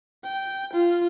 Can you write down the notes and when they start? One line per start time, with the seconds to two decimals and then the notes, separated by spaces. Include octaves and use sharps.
0.24 G5
0.72 F4